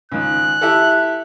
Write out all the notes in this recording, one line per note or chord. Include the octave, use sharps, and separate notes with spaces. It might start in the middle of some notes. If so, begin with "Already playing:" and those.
C#2 D#3 F#6
E4 G4 A4